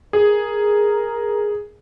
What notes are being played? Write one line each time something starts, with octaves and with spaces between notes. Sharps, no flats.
G#4 A#4